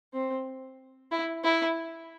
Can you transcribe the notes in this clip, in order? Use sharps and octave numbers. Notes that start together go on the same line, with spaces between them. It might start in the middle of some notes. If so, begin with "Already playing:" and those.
C4
E4
E4